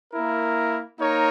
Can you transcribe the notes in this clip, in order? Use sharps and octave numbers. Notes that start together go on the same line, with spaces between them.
A#3 E4 A#4
A#3 D#4 A#4 C#5